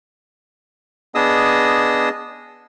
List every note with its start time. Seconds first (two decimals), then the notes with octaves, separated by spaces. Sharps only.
1.15 B3 D4 G#4 D#5 D#6 E6